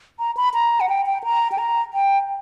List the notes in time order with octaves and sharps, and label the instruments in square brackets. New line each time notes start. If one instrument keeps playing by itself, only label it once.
[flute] A#5
B5
A#5
F#5
G5
G5
A#5
G5
A#5
G5